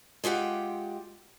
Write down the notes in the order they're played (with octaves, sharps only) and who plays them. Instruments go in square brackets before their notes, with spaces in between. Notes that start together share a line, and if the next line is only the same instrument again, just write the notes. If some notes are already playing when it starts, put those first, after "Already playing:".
[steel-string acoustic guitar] G#3 F4 G4 F#5 G5